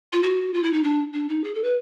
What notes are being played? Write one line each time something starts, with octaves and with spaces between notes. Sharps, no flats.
F4
F#4
F4
E4
D#4
D4
D4
D#4
G#4
A4
B4